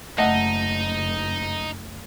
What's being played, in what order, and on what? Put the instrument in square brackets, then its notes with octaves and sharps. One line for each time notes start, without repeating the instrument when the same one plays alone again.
[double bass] F#1 [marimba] A3 [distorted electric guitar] D#4 [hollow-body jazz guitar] D#5 E5 F#5